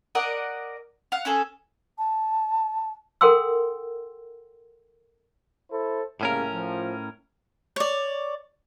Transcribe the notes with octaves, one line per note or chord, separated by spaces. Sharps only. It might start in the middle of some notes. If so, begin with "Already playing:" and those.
A#4 D5 D#5 F#5
F5 F#5
C#4 G#4 A4
A5
A4 A#4 F#5 G5 C6 E6
E4 A4 C5
C2 A2 C#3 A#3 C#4 A#4
F3
C#5 D5